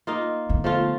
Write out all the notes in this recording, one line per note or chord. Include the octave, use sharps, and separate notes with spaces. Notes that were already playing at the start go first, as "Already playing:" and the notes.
A#3 D#4 F4
D3 B3
F3 A3 F4